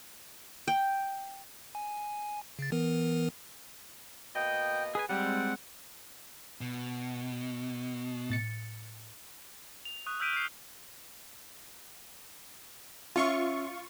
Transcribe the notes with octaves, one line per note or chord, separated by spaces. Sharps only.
G5
G#5
C#3 A6
E3 B3 A#4
B2 A#3 D#5 G5
G#4 B4 G#5
G3 G#3 C4 F#5
B2
A2 A6 C#7
F7
C#6 D#6 F#6
E6 F6 G6 B6 D7 D#7
F6 C7
C#4 F4 E5 C#6